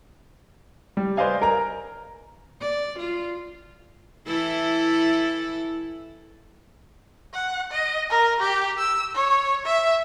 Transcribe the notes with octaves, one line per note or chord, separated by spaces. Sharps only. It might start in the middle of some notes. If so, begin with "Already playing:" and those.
G3
B4 C5 D5 D#5 F5 G#5
A#4 G#5 A#5
D5
F4
E3 E4 A4
F#5
D#5
A#4
G4
E6
C#5
E5